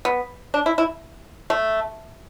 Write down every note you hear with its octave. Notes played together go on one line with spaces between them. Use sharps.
B3
D4
E4
E4
A3